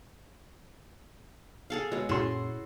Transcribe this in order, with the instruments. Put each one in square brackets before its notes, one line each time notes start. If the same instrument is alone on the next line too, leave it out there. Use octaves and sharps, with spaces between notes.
[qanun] G#4 A4 F5
[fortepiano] B2 [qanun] G#3 C#5
[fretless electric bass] F#2 A#2 C#4 [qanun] E4 G#4 A4 [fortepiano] F#4 C6